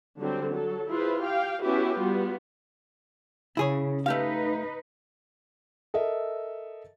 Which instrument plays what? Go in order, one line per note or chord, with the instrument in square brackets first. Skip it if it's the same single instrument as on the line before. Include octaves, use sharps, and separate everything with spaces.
[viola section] D3 F#3 G3 C4
F#3 A4
E4 F4 G#4 B4 C5
G4 F5 G5
B3 C#4 E4 F#4 G4 B4
G3 B3 F4 F#4
[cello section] C#3 [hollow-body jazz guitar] E4 G#4 C#5
[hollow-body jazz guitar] A3 G4 F5 [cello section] D#4 B4
[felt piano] A4 A#4 D#5 E5